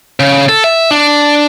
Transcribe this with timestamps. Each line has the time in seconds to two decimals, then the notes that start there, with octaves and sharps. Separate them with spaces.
0.20 C#3
0.49 A4
0.64 E5
0.91 D4